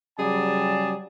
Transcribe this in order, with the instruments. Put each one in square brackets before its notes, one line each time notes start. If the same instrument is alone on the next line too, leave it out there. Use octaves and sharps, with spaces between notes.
[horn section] C#3 F#3 G3 G#4 D5 A5